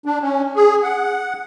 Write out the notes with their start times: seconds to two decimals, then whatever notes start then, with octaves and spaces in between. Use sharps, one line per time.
0.05 D4
0.21 C#4
0.56 G#4
0.83 F#5